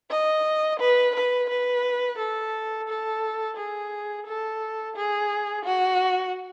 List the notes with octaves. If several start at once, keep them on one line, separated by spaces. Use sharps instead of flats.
D#5
B4
B4
B4
A4
A4
G#4
A4
G#4
F#4